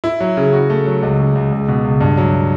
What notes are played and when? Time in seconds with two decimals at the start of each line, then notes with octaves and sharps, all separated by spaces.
0.04 E4
0.20 F#3
0.37 C#3
0.53 F#4
0.70 A3
0.86 F#3
1.02 C#2
1.19 C#3
1.35 C#2
1.52 C#2
1.68 B2
1.84 C#2
2.01 G2
2.17 F#3